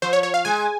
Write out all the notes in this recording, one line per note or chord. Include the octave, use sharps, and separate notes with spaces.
F3 C5
C#5
C#5
F5
G#3 G#5